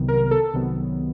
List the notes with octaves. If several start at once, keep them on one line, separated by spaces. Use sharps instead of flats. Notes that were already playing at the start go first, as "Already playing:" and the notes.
Already playing: C2 C3 D#3 F#3 B3
A#4
A4
C2 C3 D#3 F#3 B3